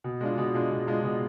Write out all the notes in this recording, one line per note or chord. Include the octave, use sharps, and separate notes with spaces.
B2
G#3 D4 F4
B2
G#3 D4 F4
B2
G#3 D4 F4
B2